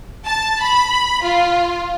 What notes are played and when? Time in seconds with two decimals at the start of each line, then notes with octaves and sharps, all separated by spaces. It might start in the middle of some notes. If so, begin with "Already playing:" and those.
0.25 A5
0.61 B5
1.22 F4